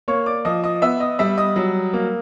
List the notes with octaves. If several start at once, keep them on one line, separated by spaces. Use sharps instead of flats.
A#3 C#5 C#6
D5 D6
F3 D#5 D#6
D#5 D#6
B3 E5 E6
D#5 D#6
G3 E5 E6
D#5 D#6
F#3
A#3